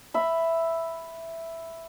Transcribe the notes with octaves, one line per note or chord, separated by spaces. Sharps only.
E5 B5